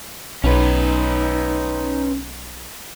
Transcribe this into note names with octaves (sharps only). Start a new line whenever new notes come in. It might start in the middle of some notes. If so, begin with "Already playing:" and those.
B1 C#4 D#4 B4